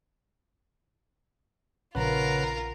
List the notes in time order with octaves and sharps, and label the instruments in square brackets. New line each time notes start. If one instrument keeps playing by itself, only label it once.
[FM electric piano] A#1 [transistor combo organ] C#3 B4 F#5 [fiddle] F4 A#4